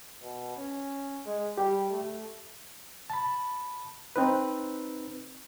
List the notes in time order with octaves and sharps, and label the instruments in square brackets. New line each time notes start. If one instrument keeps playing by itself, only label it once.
[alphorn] B2
C#4
G#3
[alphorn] G3 [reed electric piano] G4
[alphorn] A3
[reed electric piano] A5 B5
C4 D#4 B4